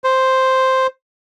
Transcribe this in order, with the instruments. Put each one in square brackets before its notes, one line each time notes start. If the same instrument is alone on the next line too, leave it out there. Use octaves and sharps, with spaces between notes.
[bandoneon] C5